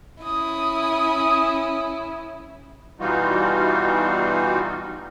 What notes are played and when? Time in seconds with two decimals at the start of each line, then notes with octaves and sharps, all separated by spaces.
0.23 C#4 E4 D#6
3.00 B2 E3 G3 D#4 F4 F#4